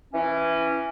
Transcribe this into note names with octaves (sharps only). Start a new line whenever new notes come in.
E3 C#4